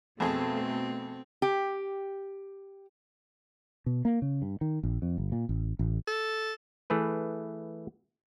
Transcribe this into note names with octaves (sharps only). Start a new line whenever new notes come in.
F2 B2 A3 C4 G#4
G4
B2
A#3
C#3
G2
D#3
A#1
F2
G1
A#2
A1
A1
A4
E3 A3 G#4 B4